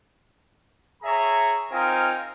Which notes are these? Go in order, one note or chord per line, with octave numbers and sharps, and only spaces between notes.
G#4 C#5 E5 A#5
C4 D#4 F4 A#4 G5 G#5